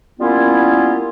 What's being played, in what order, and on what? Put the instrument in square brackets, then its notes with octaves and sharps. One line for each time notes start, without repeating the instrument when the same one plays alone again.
[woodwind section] G3 A#3 B3 C#4 E4 F4